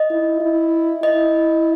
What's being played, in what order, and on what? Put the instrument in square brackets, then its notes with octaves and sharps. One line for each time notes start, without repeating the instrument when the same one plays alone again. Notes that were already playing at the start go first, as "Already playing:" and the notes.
Already playing: [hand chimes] D#5
[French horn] E4
E4
[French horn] E4 [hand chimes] D#5